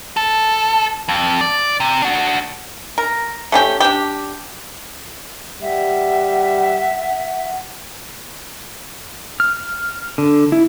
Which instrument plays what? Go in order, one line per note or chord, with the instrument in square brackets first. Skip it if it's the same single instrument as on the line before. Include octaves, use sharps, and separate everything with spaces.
[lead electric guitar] A4
F2
D5
C3
D4 F#4
[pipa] A#4
A3 C#4 G4
D4 G4
[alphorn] G3 [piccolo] E5 [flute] F#5
[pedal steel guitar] F6
D3
E4